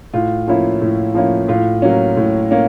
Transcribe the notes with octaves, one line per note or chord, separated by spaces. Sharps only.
A2 F4
F3 A#3 C#4 E4
A2
F3 A#3 C#4 E4
A2 F4
F#3 A#3 C#4
A2
A#3 C#4